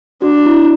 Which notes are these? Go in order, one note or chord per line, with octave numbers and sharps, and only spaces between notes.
D4 F#4
E4